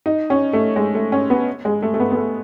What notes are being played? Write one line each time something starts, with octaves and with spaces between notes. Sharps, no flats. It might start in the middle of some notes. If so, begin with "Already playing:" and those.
D#4
C#4
A3
G#3
A3
C#4
B3
G#3
A3
A3
B3
B3
A3